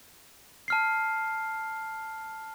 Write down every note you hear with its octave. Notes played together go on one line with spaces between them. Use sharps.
A5 F6 C7